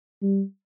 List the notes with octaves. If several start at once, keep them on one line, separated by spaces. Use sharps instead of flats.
G3